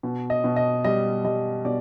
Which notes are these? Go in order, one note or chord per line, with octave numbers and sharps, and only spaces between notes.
B2
D#5
B2
D#5
G3 D#5
G3 D#5
B2 D5